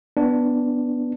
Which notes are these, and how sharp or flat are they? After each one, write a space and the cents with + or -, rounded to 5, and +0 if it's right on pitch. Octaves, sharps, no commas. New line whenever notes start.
B3 +0 D4 +0